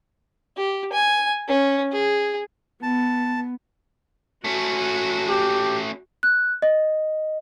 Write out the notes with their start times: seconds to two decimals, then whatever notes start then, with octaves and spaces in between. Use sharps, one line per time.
0.57 G4
0.93 G#5
1.48 C#4
1.92 G#4
2.83 B3 A5
4.44 A3 C#4 F#4
5.29 G4
6.23 F#6
6.62 D#5